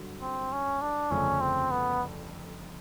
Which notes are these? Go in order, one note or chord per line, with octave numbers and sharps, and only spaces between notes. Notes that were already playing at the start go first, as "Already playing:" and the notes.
Already playing: G2 D3 F#3
C4
C#4
D4
G1 F2 C#3 F3 A3 C#4
C4
B3